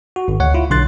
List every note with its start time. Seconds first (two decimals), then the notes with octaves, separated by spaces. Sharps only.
0.16 F#4
0.28 G#1
0.40 D2 C#5 F#5
0.54 E4 F4
0.70 B1 D3 C6 F#6 A6